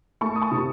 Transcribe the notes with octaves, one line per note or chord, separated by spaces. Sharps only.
A3 A5 C#6
D#6
A5 C#6
C3